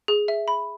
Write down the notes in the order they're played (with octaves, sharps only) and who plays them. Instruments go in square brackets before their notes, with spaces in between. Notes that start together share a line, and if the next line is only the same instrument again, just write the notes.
[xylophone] G#4
E5
B5